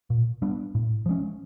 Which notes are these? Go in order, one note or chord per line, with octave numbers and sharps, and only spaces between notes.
A#2
G3 B3 D4
A2
F3 G#3 C#4